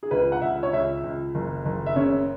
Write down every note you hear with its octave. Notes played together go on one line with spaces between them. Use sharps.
G#4
C#2 B4
F#5
C#2 E5
C#5
C#2 E5
C#2
F#1
F#1
E5
C#3 C#5